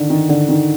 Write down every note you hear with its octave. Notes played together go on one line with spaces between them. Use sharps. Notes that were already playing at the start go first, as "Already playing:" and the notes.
Already playing: D3 D#3
D#3
D3
D#3